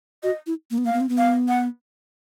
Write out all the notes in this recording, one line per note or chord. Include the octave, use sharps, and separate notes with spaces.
F#4 D#5
E4
A#3
B3
A#3 F5
B3
C4
B3
F5
F#5